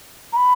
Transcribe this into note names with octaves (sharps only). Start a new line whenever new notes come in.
A#5
B5